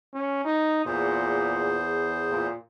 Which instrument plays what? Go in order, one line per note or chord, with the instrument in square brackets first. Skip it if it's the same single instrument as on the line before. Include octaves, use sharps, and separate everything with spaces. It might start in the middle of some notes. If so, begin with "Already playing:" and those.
[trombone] C#4
D#4
[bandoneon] E2 G#4 C5 [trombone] A#2
[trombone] A#2